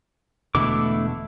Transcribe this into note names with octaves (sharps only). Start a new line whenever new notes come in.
E1 B2 D3 A3 E4 D6